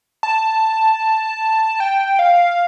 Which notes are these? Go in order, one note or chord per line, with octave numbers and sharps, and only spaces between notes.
A5
G5
F5